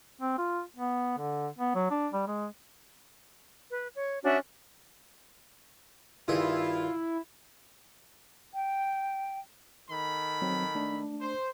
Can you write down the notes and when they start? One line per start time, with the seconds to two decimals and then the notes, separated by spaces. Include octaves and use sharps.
0.21 C4
0.38 F4
0.76 B3
1.18 D3
1.58 B3
1.75 F#3
1.91 D4
2.13 G3
2.27 G#3
3.71 B4
3.95 C#5
4.23 C#4 D4 F#4 E5
6.28 G2 D#3 E4 F4 G#4
8.54 G5
9.90 D#3 A4 B5
10.42 F#3 C4
10.75 A3 D4
11.21 C5